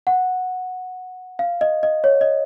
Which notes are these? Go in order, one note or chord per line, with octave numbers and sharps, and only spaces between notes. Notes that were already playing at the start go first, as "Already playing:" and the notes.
F#5
F5
D#5
D#5
C#5
D#5